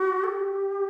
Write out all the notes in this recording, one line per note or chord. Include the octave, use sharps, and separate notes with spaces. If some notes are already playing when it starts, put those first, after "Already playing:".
Already playing: F#4
A4
G4